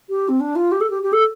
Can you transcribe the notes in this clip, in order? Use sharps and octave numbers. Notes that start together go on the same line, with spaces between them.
G4
C4
D4
F4
G4
A4
G4
G4
A4